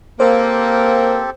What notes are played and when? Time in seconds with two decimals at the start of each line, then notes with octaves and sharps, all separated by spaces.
0.20 A#3 C4 G4 A4 C5